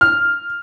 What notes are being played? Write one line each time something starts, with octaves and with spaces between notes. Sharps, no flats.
F6